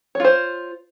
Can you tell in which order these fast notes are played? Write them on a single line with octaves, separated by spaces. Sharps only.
C#5 F4 C5